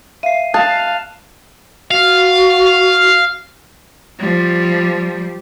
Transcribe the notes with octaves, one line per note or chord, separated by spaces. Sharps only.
E5 F5 C7 D#7
F5 A5 D#6 F#6
F#4 F5
F3 G3